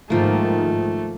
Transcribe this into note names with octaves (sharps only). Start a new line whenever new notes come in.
G#2 D#3 F3 A3 A#3